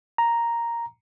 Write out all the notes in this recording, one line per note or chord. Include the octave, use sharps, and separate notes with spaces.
A#5